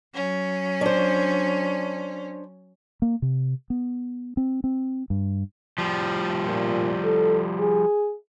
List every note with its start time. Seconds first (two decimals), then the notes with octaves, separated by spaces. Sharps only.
0.13 F#3 C#4
0.81 D4 C5
3.02 A#3
3.22 C3
3.70 B3
4.37 C4
4.64 C4
5.10 G2
5.78 F3 G3
6.46 A#2
7.04 A4
7.60 G#4